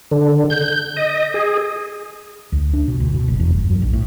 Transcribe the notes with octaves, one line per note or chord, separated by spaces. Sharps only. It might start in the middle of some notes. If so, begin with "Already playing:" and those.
D3
G6
D#5
G#4
D2
D4
B2
D2
B2
F#1
E2
G1
F#2
A#1
A2